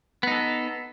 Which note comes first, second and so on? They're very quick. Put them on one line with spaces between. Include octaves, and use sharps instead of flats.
B3 D#4 A4